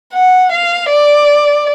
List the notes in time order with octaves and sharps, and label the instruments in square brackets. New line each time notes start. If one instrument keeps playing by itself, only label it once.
[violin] F#5
F5
D5